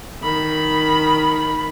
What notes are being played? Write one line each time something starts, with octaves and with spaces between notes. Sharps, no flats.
D#3 B5